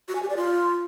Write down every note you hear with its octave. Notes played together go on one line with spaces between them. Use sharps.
F#4
G#5
G4
D5
F4